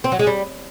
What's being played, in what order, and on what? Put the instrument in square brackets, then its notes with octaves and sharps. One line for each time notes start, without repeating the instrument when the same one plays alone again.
[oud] C4
F#3
G#3
G3